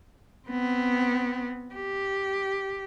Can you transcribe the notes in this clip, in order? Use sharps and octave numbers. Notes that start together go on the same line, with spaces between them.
B3 C4
G4